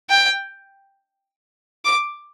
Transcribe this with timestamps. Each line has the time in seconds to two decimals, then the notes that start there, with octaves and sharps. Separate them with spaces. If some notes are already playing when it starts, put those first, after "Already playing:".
0.10 G5
1.85 D6